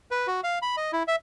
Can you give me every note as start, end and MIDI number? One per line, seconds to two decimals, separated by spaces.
0.11 0.27 71
0.27 0.41 66
0.44 0.59 77
0.62 0.76 83
0.77 0.92 75
0.93 1.03 64
1.08 1.16 76